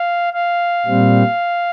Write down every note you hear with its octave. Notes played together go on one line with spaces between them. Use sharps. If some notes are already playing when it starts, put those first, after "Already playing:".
Already playing: F5
F5
A#2 G3 C4